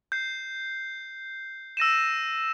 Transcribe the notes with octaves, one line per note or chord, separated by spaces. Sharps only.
G6 C7
E6 A#6 D#7 E7